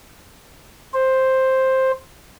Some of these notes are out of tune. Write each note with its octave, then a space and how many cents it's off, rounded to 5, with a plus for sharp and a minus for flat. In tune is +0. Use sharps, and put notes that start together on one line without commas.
C5 +5